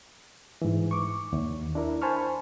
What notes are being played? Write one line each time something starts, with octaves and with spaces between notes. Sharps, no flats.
G#2 E3
C#6 D6
D#2
D4 E4 A#4
C5 G#5 A5 B5 C#6 F6